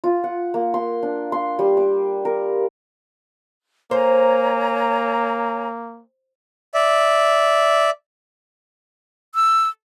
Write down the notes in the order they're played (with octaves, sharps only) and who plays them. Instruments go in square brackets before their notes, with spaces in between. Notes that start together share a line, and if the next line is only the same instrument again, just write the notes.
[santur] F4
F#5
A#3
C6
D4
C6
G3
D6
A#4
[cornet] A#3 [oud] C5 [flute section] C#5 G#5 A#5
[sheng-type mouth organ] D5 E5
[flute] E6